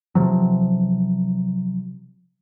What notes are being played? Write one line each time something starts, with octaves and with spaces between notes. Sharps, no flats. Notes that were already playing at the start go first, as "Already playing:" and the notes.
C3 F3 F#3